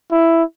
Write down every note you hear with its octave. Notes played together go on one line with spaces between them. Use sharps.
E4